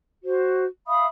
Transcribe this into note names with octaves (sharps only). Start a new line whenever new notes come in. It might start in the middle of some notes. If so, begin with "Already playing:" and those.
F#4 C5
E5 F5 B5 D#6